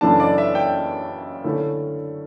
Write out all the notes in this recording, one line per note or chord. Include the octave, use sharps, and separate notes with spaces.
F#2 C#3 E3 A3 D4 A5
D5
E5
G5
D3 A3 C#4 E4